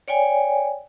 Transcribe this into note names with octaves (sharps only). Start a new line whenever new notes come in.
C#5 D5 G5 G#5